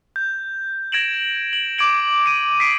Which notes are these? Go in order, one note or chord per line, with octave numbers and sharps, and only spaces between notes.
G6
G#6 A#6 D7 E7 F#7
F#7
D6 G#6 D7 F#7
D7 D#7
D#6 B6 C7 D7